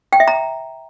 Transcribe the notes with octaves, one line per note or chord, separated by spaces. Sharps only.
G5
E5
A#5